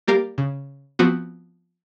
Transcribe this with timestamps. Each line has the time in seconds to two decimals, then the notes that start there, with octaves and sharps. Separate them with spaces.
0.08 G3 A#3 G4 A#4 F5
0.38 C#3
0.99 F3 B3 C4 F#4